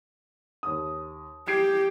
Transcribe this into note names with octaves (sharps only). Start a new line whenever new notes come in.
D#2 D#6
G4 G#6 C7 D7